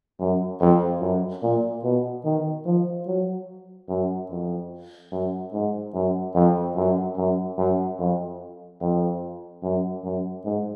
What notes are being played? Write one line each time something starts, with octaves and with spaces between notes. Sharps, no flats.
F#2
F2
F#2
A#2
B2
D#3
F3
F#3
F#2
F2
F#2
G#2
F#2
F2
F#2
F#2
F#2
F2
F2
F#2
F#2
G#2